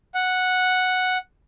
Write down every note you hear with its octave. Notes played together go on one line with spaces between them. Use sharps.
F#5